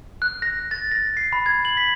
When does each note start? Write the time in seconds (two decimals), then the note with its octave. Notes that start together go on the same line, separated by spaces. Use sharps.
0.22 F#6
0.42 A#6
0.71 A6
0.91 A#6
1.17 C7
1.33 B5
1.46 G#6
1.65 F#7
1.77 B6